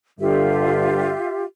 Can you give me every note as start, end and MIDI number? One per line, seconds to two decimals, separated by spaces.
0.20 1.13 43
0.20 1.13 50
0.20 1.44 65
0.20 1.44 67
0.20 1.44 76